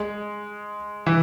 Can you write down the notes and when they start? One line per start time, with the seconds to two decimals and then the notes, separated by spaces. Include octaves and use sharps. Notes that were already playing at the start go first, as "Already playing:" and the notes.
Already playing: G#3
1.06 E3